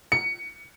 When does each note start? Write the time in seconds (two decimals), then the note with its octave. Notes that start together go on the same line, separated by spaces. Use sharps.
0.12 C#7